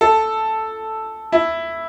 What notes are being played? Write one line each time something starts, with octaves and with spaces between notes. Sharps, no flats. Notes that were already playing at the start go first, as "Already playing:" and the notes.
A4
E4